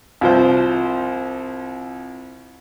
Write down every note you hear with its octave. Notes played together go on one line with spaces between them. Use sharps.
C2 F3 C5